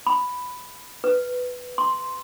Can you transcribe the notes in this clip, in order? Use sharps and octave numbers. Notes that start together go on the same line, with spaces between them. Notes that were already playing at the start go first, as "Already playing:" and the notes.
B5
B4
C6